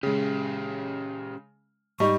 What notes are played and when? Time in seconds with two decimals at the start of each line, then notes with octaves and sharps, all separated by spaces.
0.03 C#3 G#3 C#4 G4
2.00 G#2 G3 D#4 C#6